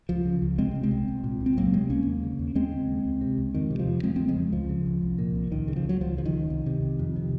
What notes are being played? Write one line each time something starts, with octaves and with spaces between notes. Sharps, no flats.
C#2 F3
C#3
C#2
C2 G#3 C4
C3
G#3 C4
C2
C2
A#2
C2
C4
C#2 F#3 A#3
C3 G#3 C4
C#2 A#3 C#4
D#2
C#3
D#2
D#2 G#3 C4
C#3
D#2
C#2
C3
C#2
F2 D#3
C3
F3
F2
F2 G#3 C4
C#3 G#3 C4
F3 G#3
F2
C#2 F3
C#3
C#2
C2
A#2
C2
C#2 D#3
C#3
F3
C#2 F#3
C#2 F3
C#3 F3
D#3
C#2
C2
C3
C2
F2
C3